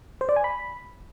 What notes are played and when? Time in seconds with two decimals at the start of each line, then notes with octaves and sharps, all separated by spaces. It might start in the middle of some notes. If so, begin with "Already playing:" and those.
0.21 C5
0.29 D5
0.36 G#5
0.44 B5